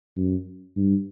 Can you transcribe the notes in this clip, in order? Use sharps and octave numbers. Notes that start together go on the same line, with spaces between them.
F#2
G2